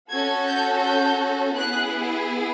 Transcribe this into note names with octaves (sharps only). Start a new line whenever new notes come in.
C#4 F#4 A4 G#6
G6
G6
B3 E4 G#4 F#6